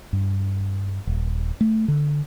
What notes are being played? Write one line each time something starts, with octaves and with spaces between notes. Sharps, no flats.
G2
D#1
A3
D3